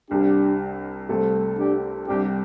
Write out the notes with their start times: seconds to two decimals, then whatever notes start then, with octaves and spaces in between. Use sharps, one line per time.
0.11 C2 C3 G3 D4 G4
1.09 C2 C3 A3 C4 A4
1.58 D4 G4
2.07 C2 C3 G3 D4 G4